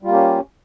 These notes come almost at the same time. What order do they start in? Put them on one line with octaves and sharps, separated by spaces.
G3 F4 A#3 G4 C#4